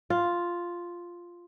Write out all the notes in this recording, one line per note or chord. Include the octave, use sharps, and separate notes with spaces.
F4